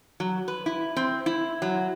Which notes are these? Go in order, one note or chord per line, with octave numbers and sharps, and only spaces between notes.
F#3
B4
E4
C4
E4
F#3